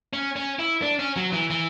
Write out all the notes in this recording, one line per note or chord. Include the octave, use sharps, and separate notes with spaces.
C#4
C#4
E4
D4
C#4
F#3
E3
E3